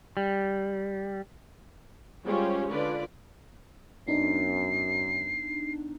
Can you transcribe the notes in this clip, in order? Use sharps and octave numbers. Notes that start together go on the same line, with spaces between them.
G3
G3 G#3 C#4 F4 G4 C5
D3 F4 B4 D5
F#2 B3 D4 D#4 C7